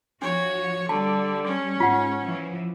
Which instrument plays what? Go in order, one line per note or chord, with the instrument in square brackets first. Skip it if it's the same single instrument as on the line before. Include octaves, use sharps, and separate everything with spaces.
[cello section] F3 F#4 [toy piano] D4 [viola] C#5
[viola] D3 [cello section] G3 [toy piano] A5
[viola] C#4
[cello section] G#2 [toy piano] F4 F#5
[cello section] E3 F3